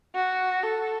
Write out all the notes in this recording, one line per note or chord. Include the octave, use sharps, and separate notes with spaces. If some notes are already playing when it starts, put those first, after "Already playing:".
F#4
A4